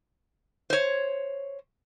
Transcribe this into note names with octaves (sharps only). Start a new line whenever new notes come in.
C5 C#5